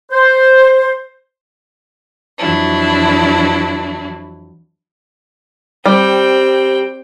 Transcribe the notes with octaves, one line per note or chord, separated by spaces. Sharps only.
C5
F2 E3 F#3 D4 E4
G3 C4 G5